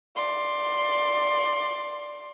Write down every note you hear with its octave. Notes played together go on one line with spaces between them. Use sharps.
D5 C6